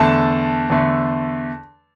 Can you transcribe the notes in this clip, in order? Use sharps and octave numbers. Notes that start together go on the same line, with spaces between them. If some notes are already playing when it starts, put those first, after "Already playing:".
Already playing: E2 D3 A3 A5
E2 D3 A3